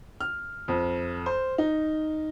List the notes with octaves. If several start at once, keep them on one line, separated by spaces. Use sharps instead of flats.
F6
F2
C5
D#4